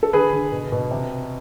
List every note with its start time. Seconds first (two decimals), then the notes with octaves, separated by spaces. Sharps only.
0.03 A4
0.13 D3 G#4 B4
0.33 D3
0.52 B2
0.72 B2
0.91 C3